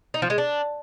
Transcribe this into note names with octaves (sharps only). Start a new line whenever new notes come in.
D#4
F3
G#3
D4